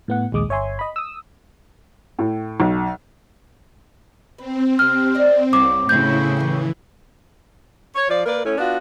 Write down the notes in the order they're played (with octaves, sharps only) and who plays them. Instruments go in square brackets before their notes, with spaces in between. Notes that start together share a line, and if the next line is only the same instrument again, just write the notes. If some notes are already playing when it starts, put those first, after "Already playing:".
[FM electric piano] A2 B3 F#5
A#1 D#2 G#3 D6 D#6
G1 C#5 E5 G#5 C6
D#5 B5
D#6 E6
[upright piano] A2
B1
[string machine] C4 [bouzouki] B4
[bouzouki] C3 G4 C5 [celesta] F6
[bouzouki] D5 D#5
[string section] C2 [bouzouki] A#3 B3 C#5 [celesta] D6
[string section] A2 C#3 [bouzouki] B3 F#4 C5 [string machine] E4 [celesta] G6
[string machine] E3 [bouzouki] A#3 G5
[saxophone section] C#5
F3 D5
A#3 A#4 B4 D5
A2 C#4
B3 D4 F4 F#4